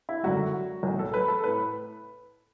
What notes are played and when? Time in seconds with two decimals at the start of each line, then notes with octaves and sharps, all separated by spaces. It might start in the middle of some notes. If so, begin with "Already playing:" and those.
0.09 E4
0.23 G#1 F#2 D3 F#4
0.83 B1 A2 E3
0.99 A4
1.14 B4
1.28 A4
1.44 A2 B4